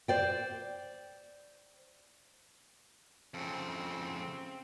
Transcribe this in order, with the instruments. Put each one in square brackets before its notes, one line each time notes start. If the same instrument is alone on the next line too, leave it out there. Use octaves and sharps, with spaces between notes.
[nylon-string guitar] C5 D5 G5
[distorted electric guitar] F2 C#3 [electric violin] C4